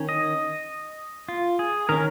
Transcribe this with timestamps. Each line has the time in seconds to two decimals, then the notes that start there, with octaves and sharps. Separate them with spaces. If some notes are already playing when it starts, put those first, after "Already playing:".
Already playing: D#3 C#4
0.09 D#5
1.29 F4
1.59 G#4
1.89 D#3 C#4 A#4